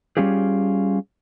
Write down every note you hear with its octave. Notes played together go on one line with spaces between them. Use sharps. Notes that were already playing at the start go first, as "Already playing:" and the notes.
G3 C#4 F4 G4 G#4